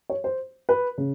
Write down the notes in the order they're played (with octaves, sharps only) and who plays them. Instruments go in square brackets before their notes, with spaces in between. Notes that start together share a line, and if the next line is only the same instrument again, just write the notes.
[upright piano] C#5
C5
B4
C#3